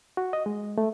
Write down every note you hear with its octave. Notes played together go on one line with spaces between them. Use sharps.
F#4
D#5
G#3
A3